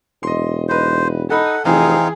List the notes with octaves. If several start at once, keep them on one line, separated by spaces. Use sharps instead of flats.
E1 D#5 C6
D#4 B4 C5
D#4 A4 F#5 B5
F1 E3 C4 D#4 G#4 F5